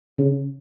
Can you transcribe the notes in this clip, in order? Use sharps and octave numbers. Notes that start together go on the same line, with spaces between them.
C#3